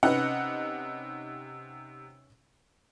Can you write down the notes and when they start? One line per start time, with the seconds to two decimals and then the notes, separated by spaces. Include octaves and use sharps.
0.03 C3 C#4 D#4 B4 F#5